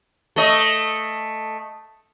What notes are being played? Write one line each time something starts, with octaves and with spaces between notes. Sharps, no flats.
A3 D#5